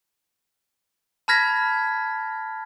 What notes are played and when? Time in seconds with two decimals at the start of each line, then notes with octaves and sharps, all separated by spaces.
1.28 A5 B5 F6 G#6 A#6 B6